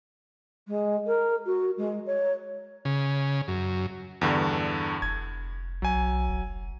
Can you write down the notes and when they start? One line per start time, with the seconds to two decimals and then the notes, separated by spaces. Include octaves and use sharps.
0.68 G#3
1.07 A#4
1.46 F#4
1.78 G#3
2.06 C#5
2.85 C#3
3.48 F#2
4.21 E2 G2 D3
5.02 F1 G#6
5.82 B1 F#3 G#5
6.30 F1